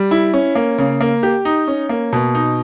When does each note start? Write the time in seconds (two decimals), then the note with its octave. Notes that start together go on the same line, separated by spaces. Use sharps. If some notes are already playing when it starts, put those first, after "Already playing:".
Already playing: G3
0.11 E4
0.33 C#4
0.55 A#3
0.78 C#3
1.01 A#3
1.23 G4
1.45 D#4
1.68 C#4
1.89 A#3
2.13 B2
2.35 D#4